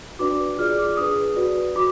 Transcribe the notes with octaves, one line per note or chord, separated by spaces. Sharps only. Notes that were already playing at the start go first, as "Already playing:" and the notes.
D4 F#4 B4 D5 D6
F4 G#4 D5 F6
D6
D4 G#4 B4 D#6
F#4 B4 D5
F#4 D6